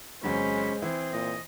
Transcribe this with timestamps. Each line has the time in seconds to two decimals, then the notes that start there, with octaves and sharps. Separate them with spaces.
0.24 E2 C3 F#3 G#3 C#4 C5 B5
0.82 E3 C4 E4 G#4
1.13 A#2 D#5